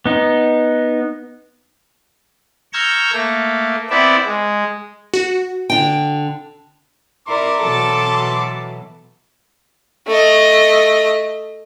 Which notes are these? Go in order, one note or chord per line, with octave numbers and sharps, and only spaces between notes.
B3 D#4
A#5 C#6 E6 F6 G6 G#6
A3 A#3
B3 C4 E4 D5 E5
G#3
F#4
D3 G5
E4 A#4 D5 C6 D6
B2 E3 F#3 A4 A5
A3 D#5